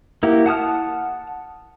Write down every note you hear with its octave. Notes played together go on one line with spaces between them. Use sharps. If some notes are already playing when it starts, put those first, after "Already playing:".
A#3 E4 F#4 G4
F#5 A5 D#6 F6